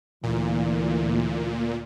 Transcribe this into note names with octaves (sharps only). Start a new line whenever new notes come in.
D2 A#2 E3